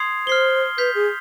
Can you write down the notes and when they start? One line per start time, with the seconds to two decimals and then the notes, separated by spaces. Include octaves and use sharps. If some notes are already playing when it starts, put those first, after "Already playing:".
Already playing: C6 D#6 G#6 C7 F7
0.27 C5 F6 C7 G7
0.78 B4 G6 B6 F7
0.95 G#4